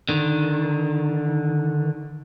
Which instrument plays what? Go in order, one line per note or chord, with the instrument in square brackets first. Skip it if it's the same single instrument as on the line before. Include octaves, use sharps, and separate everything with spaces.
[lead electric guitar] D3 D#3